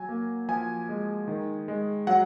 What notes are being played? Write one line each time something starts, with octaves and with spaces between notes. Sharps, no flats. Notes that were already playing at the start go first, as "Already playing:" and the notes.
Already playing: F#3 G#5
A#3
F3 G#5
G#3
D#3
G#3
F#3 F#5